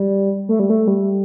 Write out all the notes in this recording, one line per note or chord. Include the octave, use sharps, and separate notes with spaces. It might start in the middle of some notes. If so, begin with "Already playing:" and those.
Already playing: G3
A3
G3
A3
G3